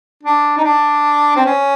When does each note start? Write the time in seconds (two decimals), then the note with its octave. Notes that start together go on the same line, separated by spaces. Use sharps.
0.23 D4
0.57 D#4
0.64 D4
1.36 C4
1.46 C#4